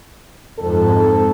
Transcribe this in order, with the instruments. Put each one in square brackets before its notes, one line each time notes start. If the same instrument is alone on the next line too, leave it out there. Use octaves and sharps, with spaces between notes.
[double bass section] F2 G#2 [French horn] A4